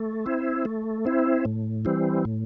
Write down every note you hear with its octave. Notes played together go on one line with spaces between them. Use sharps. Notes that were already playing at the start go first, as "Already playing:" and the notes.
Already playing: A3
C4 E4
A3
C4 E4
A2
E3 G3 C4
A2